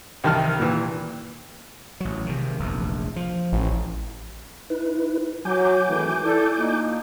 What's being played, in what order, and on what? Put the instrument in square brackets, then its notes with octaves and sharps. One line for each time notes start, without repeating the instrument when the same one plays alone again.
[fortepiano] C2 D#3 A5 F6
A#2 E3
[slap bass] A1 F#3
C3 D#3
F1 A#1 E2
F3
[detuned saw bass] A1
[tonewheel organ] D#4 E4 B4
[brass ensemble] F#3 [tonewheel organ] G#5 D6 G6
[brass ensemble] G#1 A2 E3
E4 A4 D5
A#3 D#4 F4